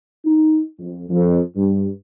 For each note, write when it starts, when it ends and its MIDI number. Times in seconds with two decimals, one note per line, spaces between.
0.25 0.61 63
0.79 1.04 41
1.09 1.39 41
1.55 1.88 43